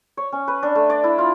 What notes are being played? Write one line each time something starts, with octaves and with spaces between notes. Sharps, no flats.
C#5
C#4
B4
D4
A3
D5
E4
F4